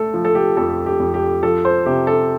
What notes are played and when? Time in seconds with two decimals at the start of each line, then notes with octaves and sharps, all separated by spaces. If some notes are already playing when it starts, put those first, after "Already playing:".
Already playing: A3 A4
0.14 F3
0.25 A4
0.35 G4
0.57 F2 A4
0.86 G4
1.00 F2
1.14 G4
1.43 F3 A4
1.65 C5
1.86 C3 G4
2.07 A4